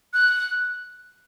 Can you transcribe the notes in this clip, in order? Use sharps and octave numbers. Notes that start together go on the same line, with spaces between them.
F#6